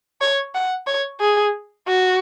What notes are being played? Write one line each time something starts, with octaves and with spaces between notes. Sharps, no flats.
C#5
F#5
C#5
G#4
F#4